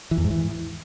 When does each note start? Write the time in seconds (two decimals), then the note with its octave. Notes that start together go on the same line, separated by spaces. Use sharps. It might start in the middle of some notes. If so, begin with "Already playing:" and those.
0.11 E3
0.18 E2
0.24 G#2
0.30 E3